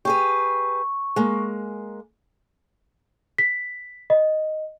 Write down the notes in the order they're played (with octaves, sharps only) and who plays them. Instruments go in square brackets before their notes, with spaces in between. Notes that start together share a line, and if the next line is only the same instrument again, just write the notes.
[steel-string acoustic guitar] G4 G#4 B4 [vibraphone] C#6
[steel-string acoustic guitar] G#3 A#3
[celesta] B6
D#5